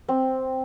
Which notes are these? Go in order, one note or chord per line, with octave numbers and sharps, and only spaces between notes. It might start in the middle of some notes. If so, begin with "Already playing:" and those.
C4